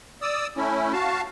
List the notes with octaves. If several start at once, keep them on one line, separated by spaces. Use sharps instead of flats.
D5 D#6 E6
A3 C#4 E4
F#4 F5 A5